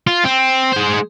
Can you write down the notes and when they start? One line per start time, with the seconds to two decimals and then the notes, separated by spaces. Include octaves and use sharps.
0.07 F4
0.25 C4
0.72 G#3 C5